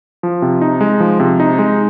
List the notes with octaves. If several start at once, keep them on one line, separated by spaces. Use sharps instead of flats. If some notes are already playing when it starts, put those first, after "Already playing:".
F3
C3
D#4
G#3
F3
C3
D#4
G#3